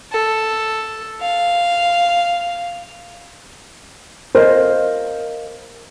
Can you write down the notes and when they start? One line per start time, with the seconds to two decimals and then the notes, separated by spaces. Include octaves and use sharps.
0.13 A4
1.21 F5
4.35 A#4 C5 D#5 F5